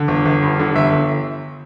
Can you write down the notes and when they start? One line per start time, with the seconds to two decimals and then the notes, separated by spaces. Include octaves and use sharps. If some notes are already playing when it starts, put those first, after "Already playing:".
Already playing: D3
0.08 G1
0.25 G1
0.43 G2
0.59 D3
0.75 G1 E5
0.93 G1